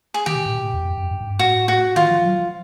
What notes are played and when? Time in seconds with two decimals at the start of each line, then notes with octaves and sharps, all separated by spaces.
0.14 G#4
0.26 D#3 G4
0.35 B2
0.46 A2
0.55 B2
0.64 A2
0.74 E2
0.83 F2
0.97 F#2
1.11 G2
1.21 G#2
1.30 G2
1.39 A2 F#4
1.68 F#4
1.96 D#3 F4
2.11 F3
2.25 F#3
2.39 F3